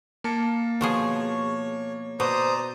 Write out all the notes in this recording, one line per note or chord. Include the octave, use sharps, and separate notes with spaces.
A#3 A5 C#7
B2 F3 G#4 C#5 C#6
B2 C5 D5 A#5 D#6